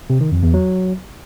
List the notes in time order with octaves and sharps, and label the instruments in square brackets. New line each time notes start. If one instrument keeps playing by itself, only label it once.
[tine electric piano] C3
D#3
F2
E2
F#3